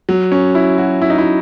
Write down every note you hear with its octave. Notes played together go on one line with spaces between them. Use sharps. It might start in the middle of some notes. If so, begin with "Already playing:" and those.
F#3
C#4
E4
F#4
E4
D#4
E4